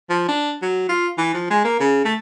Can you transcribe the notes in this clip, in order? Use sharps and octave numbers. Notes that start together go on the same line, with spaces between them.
F3
D4
F#3
F4
E3
F3
G#3
A#3
C#3
A3